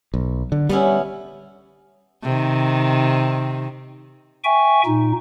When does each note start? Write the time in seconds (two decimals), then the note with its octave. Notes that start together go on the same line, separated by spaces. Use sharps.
0.14 B1
0.52 D3
0.69 G3 B3 C#4 E4
2.23 C3 D#3
4.44 E5 G5 G#5 C#6
4.85 A#2 D#4